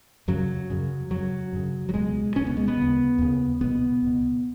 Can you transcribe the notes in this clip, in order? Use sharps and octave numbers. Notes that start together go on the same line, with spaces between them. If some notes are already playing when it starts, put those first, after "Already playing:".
F#2 C#3 F#3
F#2 C#3
F#2 C#3 F#3
F#2 C#3
F#3
C#2 B2 G#3
C#2 B2 C#4
B3
G#3
B3
D#2 C#3
D#2 C#3
C#2 B2 B3
C#2 B2